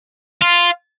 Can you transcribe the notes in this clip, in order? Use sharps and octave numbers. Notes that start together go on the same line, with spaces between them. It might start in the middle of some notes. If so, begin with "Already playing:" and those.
F4